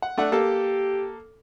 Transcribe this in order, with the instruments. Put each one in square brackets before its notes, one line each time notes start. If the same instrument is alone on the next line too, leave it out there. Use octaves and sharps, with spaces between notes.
[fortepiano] F#5
A3 D4 F#5
[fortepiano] A#3 A4 [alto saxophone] G4